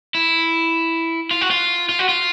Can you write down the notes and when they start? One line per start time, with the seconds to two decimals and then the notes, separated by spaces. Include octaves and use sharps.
0.15 E4
1.31 F4
1.41 F#4
1.51 F4
1.89 F4
1.99 F#4
2.09 F4